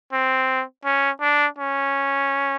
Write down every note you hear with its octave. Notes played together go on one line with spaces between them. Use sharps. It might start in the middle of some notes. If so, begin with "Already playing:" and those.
C4
C#4
D4
C#4